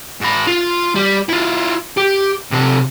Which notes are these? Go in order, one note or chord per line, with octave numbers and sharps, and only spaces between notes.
G#2 B5
F4
G3
E4 F4
G4
C3 A4